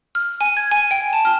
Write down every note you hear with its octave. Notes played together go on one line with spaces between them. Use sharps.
F6
G#5
G#6
G#5
G5
A5
F6